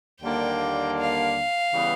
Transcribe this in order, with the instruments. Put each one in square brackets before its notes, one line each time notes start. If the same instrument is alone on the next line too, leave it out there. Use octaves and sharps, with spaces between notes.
[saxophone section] D#2 D3 G3 A#3 D4 [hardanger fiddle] G5
[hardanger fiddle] F5
[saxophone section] C#3 E3 G3 B3